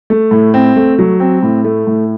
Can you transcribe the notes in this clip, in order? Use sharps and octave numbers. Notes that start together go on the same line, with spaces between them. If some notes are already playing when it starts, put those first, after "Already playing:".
A3
A2
C4
A3
F#3
C4
A2
A3
A2